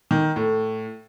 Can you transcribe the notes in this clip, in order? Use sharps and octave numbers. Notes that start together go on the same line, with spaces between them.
D#3
A2